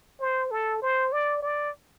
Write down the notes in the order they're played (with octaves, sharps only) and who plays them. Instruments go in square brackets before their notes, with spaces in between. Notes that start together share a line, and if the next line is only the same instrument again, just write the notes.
[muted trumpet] C5
A4
C5
D5
D5